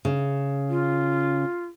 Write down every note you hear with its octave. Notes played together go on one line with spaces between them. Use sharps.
C#3
F4